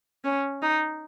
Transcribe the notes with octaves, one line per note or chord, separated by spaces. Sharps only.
C#4
D#4